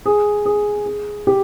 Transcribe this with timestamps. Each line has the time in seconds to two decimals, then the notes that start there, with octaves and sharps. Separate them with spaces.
0.06 G#4
0.46 G#4
0.86 G#4
1.27 G4